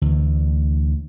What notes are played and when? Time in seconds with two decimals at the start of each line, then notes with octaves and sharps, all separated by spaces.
0.01 D2 E3